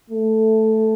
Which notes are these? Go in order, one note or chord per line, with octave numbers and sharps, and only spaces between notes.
A3